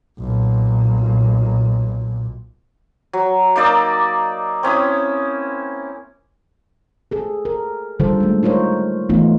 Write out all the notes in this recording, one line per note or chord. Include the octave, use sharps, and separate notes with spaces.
B1 A#2
F#3
A#3 D#4 D5 E6
C4 C#4 E4 D#6
G#4 A4
A#4
D3 D#3 G3 F4 A4 C5
G#3 A3
D#4 F4 A#4 C5 C#5
E3 A3 B3 D#4 F4